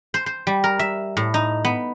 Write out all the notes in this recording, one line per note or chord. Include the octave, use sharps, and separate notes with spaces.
C5
C5
G3
A#4
E5
A2
D#4
B3